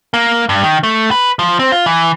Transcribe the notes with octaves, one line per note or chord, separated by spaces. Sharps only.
A#3
G2
D#3
A3
B4
F3
C4
F4
E3